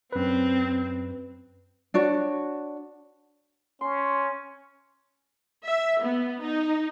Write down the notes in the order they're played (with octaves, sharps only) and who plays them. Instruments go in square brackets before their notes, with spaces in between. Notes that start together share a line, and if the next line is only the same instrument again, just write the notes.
[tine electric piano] F#2 B4 [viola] C4
[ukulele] D4 F#4 C#5
[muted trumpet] C#4 [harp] C6
[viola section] E5
B3
D#4